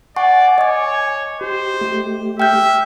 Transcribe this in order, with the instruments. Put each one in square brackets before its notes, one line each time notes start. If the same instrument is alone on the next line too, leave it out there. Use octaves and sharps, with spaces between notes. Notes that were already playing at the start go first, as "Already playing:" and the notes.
[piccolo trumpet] D5 [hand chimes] F#5 C#6 [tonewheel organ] G#5
[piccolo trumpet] C#5 [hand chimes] D#5 D6
[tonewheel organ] G4 [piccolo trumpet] C5
[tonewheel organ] A3 G4
[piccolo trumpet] E5 [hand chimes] G5 F6 G6